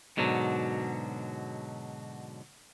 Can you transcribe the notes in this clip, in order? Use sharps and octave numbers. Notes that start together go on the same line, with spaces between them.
G#2 B2 D3 F#3